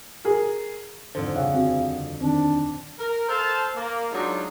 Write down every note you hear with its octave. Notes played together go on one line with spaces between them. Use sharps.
G#4 A#4
D#1 F2 G#2 D3 C5
C#3 C#5 E5 F#5
C4 F#4
D#3 C4 D4
A#4
A4 C5 F5 A5
A#3
F#3 G#3 D4 D#4 F4 F#4